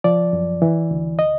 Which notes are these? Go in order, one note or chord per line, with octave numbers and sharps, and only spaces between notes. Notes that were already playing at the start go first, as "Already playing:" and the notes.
F3 D5
F#2
E3
D2
D#5